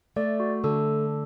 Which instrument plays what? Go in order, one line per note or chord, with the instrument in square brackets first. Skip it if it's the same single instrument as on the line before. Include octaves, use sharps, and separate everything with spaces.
[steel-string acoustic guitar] A3 [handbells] D5
[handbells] F#4
[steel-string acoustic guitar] D3 [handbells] A4